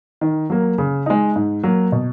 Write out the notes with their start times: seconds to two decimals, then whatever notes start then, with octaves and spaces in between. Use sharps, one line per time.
0.21 D#3
0.50 F#3 A#3
0.78 C#3
1.06 G#3 D#4
1.36 G#2
1.63 F#3 A#3
1.92 B2